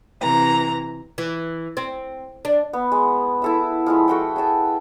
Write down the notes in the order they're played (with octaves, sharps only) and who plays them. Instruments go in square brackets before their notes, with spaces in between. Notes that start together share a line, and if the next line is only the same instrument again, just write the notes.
[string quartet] C3 E3 A#5
[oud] E3
C4
D4
[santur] B3
G#3
E4 A4 E5
F3 G#3 E4
F#4 A4 G5
G#4 E5 G5 A5